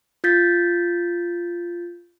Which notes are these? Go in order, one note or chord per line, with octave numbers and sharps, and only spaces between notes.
F4 G6 A6 B6